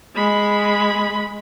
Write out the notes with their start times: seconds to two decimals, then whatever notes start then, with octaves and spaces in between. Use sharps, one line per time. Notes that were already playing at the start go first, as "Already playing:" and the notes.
0.16 G#3 B5